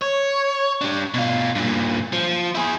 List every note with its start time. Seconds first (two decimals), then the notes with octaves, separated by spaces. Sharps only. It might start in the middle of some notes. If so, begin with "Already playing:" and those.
0.02 C#5
0.81 G3 D4
1.14 B2 F4
1.56 G2 A#2
2.13 F3
2.55 E4 G#4